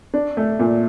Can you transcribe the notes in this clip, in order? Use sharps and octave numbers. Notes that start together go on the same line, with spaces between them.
D4
A3
A#2